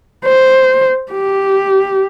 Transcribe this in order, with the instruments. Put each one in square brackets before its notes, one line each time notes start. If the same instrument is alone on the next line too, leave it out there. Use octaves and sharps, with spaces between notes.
[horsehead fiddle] C5
G4